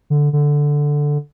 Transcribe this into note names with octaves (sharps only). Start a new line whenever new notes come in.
D3
D3